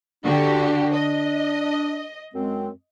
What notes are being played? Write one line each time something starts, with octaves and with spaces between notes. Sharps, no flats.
D3 D4 F#4 G4
D#5
F#2 G#3 C4